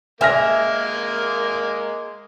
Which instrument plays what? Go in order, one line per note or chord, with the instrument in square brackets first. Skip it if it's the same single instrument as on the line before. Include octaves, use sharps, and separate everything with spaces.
[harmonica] G#3 A#3 A#4 [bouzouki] E5 [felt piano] G#5 F6 A#6